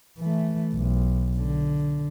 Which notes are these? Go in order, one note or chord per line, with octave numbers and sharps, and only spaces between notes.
E3 A3
B1
D3